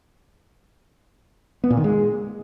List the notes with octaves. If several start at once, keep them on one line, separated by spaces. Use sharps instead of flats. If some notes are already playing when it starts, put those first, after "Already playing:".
B3
A#2
D#3
G#3